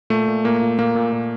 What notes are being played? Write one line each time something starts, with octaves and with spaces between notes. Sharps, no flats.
A#2 A3
A#2
A#2 A#3
A#2
A#2 A#3
A#2
A#2